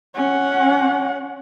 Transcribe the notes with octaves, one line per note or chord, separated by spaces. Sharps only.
C#4 F#5